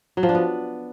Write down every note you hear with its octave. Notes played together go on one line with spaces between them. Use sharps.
F#3
F3
D4
B3